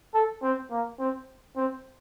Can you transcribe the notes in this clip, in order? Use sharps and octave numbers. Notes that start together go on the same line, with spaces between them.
A4
C4
A#3
C4
C4